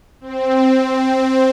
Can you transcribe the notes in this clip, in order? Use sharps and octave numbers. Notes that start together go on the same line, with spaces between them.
C4